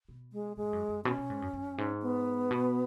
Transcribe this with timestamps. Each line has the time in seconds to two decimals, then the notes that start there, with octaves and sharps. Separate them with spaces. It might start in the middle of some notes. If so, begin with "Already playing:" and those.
0.09 B2
0.33 G#3
0.57 G#2 G#3
0.73 F#2
0.89 F#2
1.05 B2 C#4
1.17 B2
1.30 G#2
1.42 F#2
1.53 F#2
1.78 G#2
2.02 B3
2.51 B2